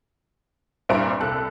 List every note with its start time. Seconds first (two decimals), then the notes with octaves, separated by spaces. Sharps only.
0.89 G2 A#2 C4 E4 A#5 D7
1.20 C2 A4 F#6